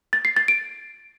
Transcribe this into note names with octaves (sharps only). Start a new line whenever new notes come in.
A6
C7
A6
D7